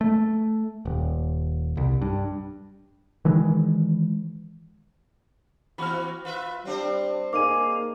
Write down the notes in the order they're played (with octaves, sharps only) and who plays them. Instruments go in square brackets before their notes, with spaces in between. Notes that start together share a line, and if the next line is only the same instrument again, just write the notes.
[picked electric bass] A3
D#1
C2
G2
D#3 E3 G#3
[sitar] E3 C4 F#4 [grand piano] B5 F6
[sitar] F4 B4 E5
[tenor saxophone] G3 [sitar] C4 D4 C5
[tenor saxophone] A#3 [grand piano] D#4 G#4 [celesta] D6 D#7